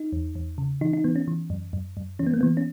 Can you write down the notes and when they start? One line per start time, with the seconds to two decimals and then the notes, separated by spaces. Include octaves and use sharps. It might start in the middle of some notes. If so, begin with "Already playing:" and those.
Already playing: D#4
0.13 E2
0.35 E2
0.58 C#3
0.81 E3 D#4
0.93 D#4
1.04 E3 B3
1.16 C#4
1.28 E3
1.50 F#2
1.73 F#2
1.97 F#2
2.19 E3 C#4
2.27 B3
2.34 A#3
2.41 E3 B3
2.57 C#4